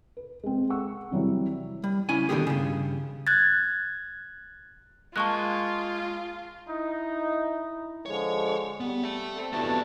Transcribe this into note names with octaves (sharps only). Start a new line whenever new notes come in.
B4
G#3 C4
F#5 C#6 E6
C3 E3 F#3 G3
G3
C#2 C#4 E4 G#5
B2 D3 D#3 C4 G4 G#4
G2 C#3
F#6 G#6 A6
G#3 A#3 F4 A5 C#6 F#6
D#4 E4
D3 F3 G#3 C#5
G3 B3
E5 A5
C4 A4
F2 E3 A3 B3 D4 F#4 G4 A5